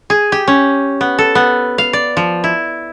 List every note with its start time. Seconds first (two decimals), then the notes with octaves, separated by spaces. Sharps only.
0.10 G#4
0.32 G4
0.48 C#4
1.01 B3
1.18 A4
1.35 B3
1.78 F5
1.93 D5
2.17 F3
2.44 E4